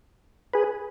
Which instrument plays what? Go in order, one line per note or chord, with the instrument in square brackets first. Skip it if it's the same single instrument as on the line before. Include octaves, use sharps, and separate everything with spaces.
[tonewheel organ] G#4 B4